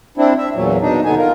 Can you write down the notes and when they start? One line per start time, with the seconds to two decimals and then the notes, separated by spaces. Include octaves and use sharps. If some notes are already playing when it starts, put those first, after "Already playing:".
0.18 C4 D4 E4
0.38 E5
0.55 E2 A#2 F#3
0.82 B2 D4 D#4
1.05 D#2 D3 B3 D#4 G#5
1.18 F4 A#4